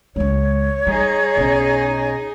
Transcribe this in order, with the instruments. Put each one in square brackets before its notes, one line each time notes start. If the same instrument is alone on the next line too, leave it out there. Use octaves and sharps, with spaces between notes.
[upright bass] C#2 G#3 [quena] C#5
[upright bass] G3 [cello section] D#4 G#4
[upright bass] B1 C#4